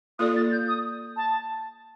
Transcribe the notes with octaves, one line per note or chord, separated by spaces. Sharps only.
A#3 F4 A4 D5 D#6
A6
G6
D#6
A5